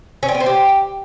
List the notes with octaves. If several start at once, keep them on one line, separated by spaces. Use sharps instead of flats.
C#4
C4
B3
C5
G4